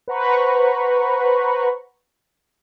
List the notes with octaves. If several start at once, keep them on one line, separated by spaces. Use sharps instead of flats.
B4 C5 F#5 A#5 B5 C#6